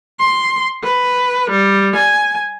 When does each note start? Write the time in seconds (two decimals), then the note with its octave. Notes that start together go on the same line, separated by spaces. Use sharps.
0.20 C6
0.83 B4
1.51 G3
1.96 G#5